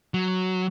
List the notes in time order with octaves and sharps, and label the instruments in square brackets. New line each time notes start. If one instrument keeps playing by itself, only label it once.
[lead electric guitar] F#3